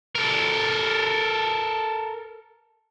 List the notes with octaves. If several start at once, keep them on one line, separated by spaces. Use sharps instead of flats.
A4 A#4